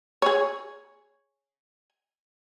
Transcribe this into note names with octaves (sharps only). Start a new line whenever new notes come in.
G#4 C#5